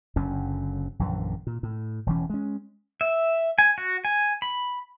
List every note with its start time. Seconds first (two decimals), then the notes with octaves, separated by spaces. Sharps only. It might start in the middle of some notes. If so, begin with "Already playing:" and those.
0.16 F#1 F#2 D3 C#4
0.99 A#1 F#2 D3 E3
1.47 A#2
1.63 A2
2.06 E1 E3 C#4
2.30 G#3 C#4
3.01 E5
3.58 G#5
3.78 F#4
4.05 G#5
4.42 B5